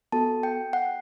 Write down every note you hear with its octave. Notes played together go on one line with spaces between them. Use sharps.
B3 F#4 A4 A5
G5
F#5